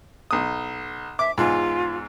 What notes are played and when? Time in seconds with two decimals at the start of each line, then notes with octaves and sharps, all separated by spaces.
0.31 B1 D#6
1.19 E5 D6
1.38 E2 G#2 F4